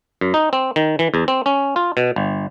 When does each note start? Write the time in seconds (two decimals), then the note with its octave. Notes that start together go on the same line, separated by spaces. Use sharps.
0.21 F#2
0.34 D#4
0.53 C4
0.76 D#3
0.99 E3
1.14 E2
1.28 C4
1.46 C#4
1.76 F4
1.97 B2
2.16 G1